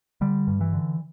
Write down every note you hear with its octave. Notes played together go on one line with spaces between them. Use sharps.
D3 G3
G2
E3
D3